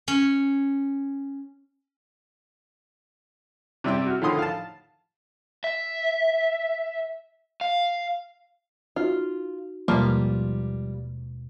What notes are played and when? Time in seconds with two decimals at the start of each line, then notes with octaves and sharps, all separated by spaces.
0.08 C#4
3.84 C3 G3 E4 E5 G5
4.06 F#4 F6
4.21 A2 D3 D#3 F3 C6 D#6
4.39 F5 A5
5.64 E5
7.61 F5
8.96 D#4 F4 F#4
9.88 D#2 B2 F3 G3 G#3 A#3 F4